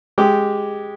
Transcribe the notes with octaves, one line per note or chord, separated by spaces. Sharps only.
G#3 G4